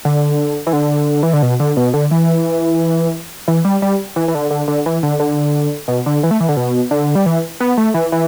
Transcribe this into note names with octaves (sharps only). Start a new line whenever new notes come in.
D3
E3
D3
E3
D3
B2
D3
B2
D3
E3
E3
G3
G3
E3
E3
D3
D3
D3
E3
D3
D3
B2
D3
E3
A3
E3
D3
B2
D3
G3
E3
B3
A3
E3
E3